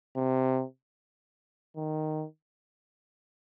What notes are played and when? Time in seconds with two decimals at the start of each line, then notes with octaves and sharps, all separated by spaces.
0.16 C3
1.77 D#3